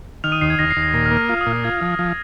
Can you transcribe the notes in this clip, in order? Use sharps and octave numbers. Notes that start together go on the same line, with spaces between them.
D#3 F6 F7
D#6 D#7
D#2 C7
G#6
D#2 A#6
C7
D#2
A#6
A#2 A#6
F6
A#3
F6
F4 F6
D#6
A#2
F6
F4 G#6
F3
F3